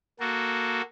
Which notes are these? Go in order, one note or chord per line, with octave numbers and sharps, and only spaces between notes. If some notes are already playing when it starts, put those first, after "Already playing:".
A#3 F#4 A4